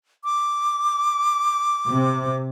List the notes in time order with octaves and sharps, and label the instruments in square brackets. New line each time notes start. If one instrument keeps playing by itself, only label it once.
[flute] D6
[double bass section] C3